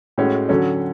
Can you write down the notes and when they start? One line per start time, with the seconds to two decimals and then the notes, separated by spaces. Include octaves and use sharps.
0.18 A2 G#3 C#4 F#4
0.49 D3 F#3 C#4